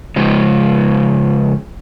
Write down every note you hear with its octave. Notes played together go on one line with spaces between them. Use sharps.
C#3 F3 G#3